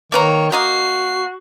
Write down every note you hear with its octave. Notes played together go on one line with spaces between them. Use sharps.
D#3 A#3 B4 C#5 A#5
A#3 F#4 D#5 A#5 C7